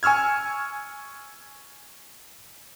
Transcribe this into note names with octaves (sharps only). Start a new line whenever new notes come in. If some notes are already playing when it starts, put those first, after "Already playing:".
G#5 C#6 E6 F6 G#6